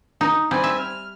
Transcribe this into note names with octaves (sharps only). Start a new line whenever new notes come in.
D#4
G3 C4 G#5
E5
F6